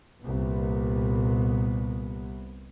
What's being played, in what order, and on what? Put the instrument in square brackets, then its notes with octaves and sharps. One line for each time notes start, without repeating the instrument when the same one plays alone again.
[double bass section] C2 A#2 B3